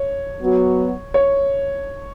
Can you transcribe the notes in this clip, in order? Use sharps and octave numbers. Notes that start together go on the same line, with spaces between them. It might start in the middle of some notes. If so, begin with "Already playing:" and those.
Already playing: C#5
F#3 B3 F#4
C#5